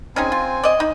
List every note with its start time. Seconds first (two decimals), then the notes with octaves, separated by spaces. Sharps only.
0.16 C4 C#4 D#4 G#4 G#5
0.32 F4
0.63 D5 D#5
0.80 D#4